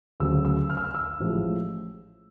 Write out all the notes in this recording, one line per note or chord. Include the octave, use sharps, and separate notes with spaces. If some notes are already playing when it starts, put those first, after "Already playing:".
D2 C#3 F#3 E6
E6
F6
E6
F6
E6
A1 A2 F3 G#3